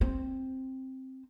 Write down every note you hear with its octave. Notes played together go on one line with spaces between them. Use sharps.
C4